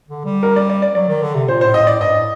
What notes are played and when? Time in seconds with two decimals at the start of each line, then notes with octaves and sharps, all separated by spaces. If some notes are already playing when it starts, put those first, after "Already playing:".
0.09 D3
0.25 G3
0.43 A#4
0.56 D5
0.70 D5
0.82 D5
0.95 F#3 D5
1.08 D#3
1.22 D3
1.35 C3
1.48 A#2 C5
1.61 A2 C5
1.74 D#5
1.83 A2 D5
2.00 G2 D#5
2.14 A2